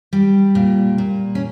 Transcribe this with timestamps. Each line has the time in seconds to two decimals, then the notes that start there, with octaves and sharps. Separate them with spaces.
0.13 G3
0.55 A#2
0.98 A#2
1.35 C#4